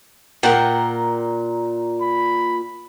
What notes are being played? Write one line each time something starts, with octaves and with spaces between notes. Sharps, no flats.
A#2 A#4 F#5 G5
B5